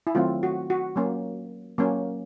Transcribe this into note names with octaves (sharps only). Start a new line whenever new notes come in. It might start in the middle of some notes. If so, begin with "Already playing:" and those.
E4
D#3 F#3 A3 C4 F4
F#4
F#4
F#3 A#3 C#4
F#3 A#3 C#4